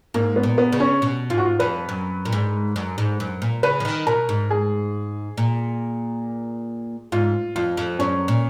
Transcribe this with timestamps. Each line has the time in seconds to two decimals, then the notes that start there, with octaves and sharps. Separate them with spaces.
0.14 G#2 A#3
0.36 B3
0.43 A#2
0.58 B3
0.72 C#3
0.80 C#4
1.02 B2
1.30 G#2 F4
1.38 F#4
1.45 F4
1.59 F2 B4
1.89 F#2
2.25 A#2
2.33 G#2
2.76 F#2
2.98 G#2
3.20 F#2
3.42 A#2
3.63 C#3 B4
3.80 F3
3.85 D#3
4.07 B2 A#4
4.29 G#2
4.50 G#4
5.38 A#2
7.12 G#2 F4
7.56 F2 F4
7.77 F2
7.99 F#2 C#4
8.28 A#2